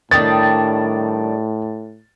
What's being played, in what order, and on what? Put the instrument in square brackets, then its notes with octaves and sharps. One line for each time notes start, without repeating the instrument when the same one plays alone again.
[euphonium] A2 [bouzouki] D#3 G3 D4 [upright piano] A6